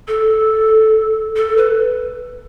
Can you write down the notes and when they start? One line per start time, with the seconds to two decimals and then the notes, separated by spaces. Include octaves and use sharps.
0.08 A4
1.36 A4
1.57 B4